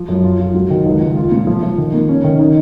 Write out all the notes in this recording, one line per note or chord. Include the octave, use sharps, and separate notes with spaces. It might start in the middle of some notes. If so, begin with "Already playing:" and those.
Already playing: F3
F#2
F4
F4
F#3
D#3
C#2
C#2
F4
A#2
F3
F3
D#3
A#3
C#4
D#3
D#4